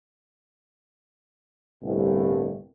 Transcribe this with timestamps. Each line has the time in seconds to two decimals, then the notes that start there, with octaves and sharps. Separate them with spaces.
1.83 G1 C2 A2